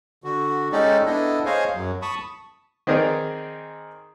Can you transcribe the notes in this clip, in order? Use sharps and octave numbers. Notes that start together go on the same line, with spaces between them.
D3 F#4
G#3 C#4 D#4 G4 A4 D5
B3 D4 E4 A4 D#5
G#4 C5 C#5 D#5 F5 G#5
F#2 F#3
A5 B5 C#6 D#6
D#3 C4 D#4 G#4 A#4 D5